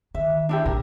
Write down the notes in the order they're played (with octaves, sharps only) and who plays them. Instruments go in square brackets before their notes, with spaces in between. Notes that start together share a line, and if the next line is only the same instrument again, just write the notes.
[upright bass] D#3 [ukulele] E5
[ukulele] D4 E4 G4
[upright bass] A#1 B2 [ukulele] A#4